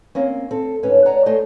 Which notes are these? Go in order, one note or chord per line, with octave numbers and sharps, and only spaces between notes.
A#3 C4 C#4
C4 A4
D2 G#2 C#4 B4
C#5 D5 F#5 G#5 A#5
A3 C5 C#5 D#5 G#5